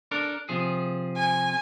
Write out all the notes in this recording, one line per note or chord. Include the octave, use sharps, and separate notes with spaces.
D4 A4 A#4
C3 F3 G#4
G#5